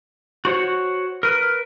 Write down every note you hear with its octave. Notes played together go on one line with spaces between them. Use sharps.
F#4 C5 C#5 F#5
A#4 B4